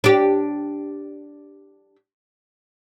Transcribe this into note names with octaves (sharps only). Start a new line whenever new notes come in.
D4 G4